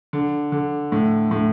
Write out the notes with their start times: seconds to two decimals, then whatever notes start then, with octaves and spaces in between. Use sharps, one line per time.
0.13 D3
0.52 D3
0.92 A2
1.31 A2